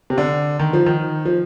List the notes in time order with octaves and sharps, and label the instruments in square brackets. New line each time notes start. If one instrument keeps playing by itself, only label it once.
[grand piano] C3
D3
D#3
F3
D#3
F3